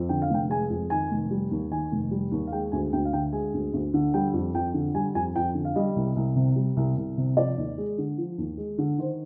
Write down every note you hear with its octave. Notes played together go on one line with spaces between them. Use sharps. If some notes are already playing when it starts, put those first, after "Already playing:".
Already playing: F2
D3 G5
F5
F1 G5
G#3 G#5
F2
D#3 G#5
F1
G3
D#2
D#3 G#5
F1
G3
D#2
F5
G#3 G5
D2 G#5
D2 G5
F5
D3 G5
G#3 G#5
D2
D2
D3
G3 G5
F2
F2 G5
D3
G3 G#5
F2 G#5
F2 G5
D3
F5
G3 D#5
C2
C2
C3
G3
C2
C2
C3
F3 D5
D#2
G#3
D3
F3
D#2
G#3
D3
D#3 C5